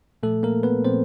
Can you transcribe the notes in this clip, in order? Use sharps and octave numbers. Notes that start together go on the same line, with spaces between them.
A#2 F3 A3 A4
A#3 A#4
B3 B4
A#2 F3 C4 C5